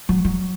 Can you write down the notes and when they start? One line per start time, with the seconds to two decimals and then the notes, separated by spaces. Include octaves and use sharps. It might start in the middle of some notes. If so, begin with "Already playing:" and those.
0.09 F#3
0.25 F#3